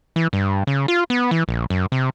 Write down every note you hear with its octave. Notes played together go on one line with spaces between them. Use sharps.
E3
G2
C#3
F4
B3
E3
A#1
F#2
C3